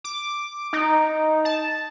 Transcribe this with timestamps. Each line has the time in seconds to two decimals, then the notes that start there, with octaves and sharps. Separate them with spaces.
0.04 D6
0.73 D#4
1.45 A5